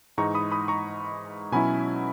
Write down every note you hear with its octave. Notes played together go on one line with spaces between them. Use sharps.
G#2 E3 G#3 D#4 A#5 C#6
B5 D#6
B5 D#6
A#5 C#6
B2 F#3 C#4 E4 G#5 B5